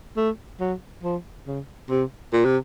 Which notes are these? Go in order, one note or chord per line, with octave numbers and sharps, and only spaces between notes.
A3
F#3
F3
C#3
C3
A#2
C3